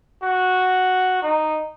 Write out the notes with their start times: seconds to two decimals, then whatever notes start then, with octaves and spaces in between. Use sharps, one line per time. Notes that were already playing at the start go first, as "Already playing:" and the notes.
0.23 F#4
1.22 D#4